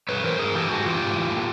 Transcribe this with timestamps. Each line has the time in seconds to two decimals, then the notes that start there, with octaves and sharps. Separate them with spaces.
0.09 G2 B4 C#5
0.23 E3 A#4 C5
0.39 G2 G#4 A#4
0.55 E3 G4 A4
0.70 G#2 F#4 G#4
0.86 E3 F4 G4
1.01 G#2
1.16 E3
1.31 A2